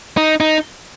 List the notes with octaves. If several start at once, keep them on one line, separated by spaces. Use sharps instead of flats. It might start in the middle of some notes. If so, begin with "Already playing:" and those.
D#4
D#4